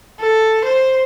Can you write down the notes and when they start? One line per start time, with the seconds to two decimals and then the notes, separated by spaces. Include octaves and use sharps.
0.20 A4
0.65 C5